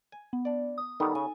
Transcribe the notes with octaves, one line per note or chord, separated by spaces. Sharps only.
G#5
B3
D4 D5
D#6
D#3 G3 B3 D#4 A4
C#3 G#5